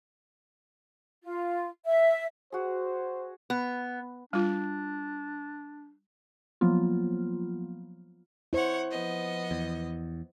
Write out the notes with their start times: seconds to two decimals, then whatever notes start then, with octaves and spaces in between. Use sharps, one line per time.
1.23 F4
1.84 E5
2.52 F#4 G#4 C5
3.50 B3
4.33 G3 D4 F4
6.61 F3 F#3 A#3 B3 F4
8.53 E4 C5 C#5 F#5
8.90 F3 B3 D#5
9.51 E2